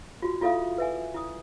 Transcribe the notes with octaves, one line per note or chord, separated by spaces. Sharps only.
F4 F#4
E4 F4 A4 E5 F5 D#6
B4 E5 G#5
E4 D#6